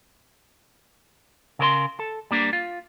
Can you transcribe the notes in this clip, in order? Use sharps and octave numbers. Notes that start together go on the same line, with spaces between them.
C#3 A#4 C5 C6
A4
G3 A#3 D4
F4